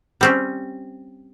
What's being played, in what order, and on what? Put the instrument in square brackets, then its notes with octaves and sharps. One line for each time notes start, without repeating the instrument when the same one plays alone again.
[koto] G3 C4 C#4